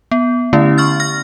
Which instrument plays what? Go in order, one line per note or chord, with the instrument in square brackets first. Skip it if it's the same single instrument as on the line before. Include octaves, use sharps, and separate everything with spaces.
[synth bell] B3
D3 A3 C#4 E4
C#6 F6 A6
F6 A#6